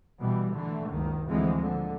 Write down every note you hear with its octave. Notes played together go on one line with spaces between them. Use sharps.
B2 E3 G3
D3 E3 A3
F#1 C#2 D#3
D2 D3 E3 F3 G#3 C4
A#2 D3